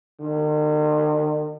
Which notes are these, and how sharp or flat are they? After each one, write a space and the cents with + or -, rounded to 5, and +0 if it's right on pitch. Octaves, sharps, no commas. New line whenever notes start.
D#3 -45